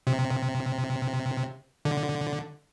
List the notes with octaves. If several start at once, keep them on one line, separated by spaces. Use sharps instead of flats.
C3
D3